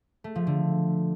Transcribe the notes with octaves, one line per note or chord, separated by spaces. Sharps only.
A3
F3
D3